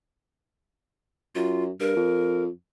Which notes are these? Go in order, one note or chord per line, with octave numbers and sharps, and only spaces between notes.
F#2 F4
G2 A#4
F2